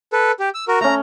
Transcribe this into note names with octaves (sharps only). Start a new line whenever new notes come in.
A4 B4
G4
E6
F#4 A#4
A3 C#4 A#5